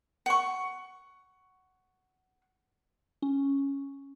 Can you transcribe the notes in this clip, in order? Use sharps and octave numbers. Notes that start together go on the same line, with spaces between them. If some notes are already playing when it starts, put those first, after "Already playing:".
F#5 C#6
C#4